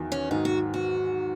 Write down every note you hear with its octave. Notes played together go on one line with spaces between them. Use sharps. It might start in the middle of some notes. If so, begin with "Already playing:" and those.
Already playing: E2 D#3 F#3
C#4
G#2 D#3 F#3 D#4
F#4
F#4